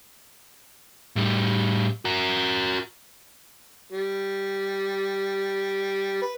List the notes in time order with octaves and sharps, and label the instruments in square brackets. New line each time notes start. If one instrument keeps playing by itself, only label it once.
[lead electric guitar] A2 G3
F#4 A#4
[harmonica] G3
B4